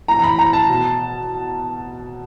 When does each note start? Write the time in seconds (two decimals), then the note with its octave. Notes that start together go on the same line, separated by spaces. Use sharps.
0.08 A2 E3 A#5
0.19 A#5
0.24 B5
0.39 A#5
0.53 A5
0.68 B2